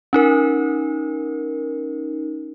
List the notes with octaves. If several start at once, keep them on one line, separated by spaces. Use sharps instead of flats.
C#4 D#4 A#4